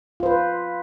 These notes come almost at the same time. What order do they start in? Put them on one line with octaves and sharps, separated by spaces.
F4 C5 B4